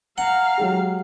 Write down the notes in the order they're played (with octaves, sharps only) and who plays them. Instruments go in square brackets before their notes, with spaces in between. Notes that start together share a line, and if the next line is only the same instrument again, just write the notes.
[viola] F5 [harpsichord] F#5 [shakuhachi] A#5
[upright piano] F#3 G#3 G4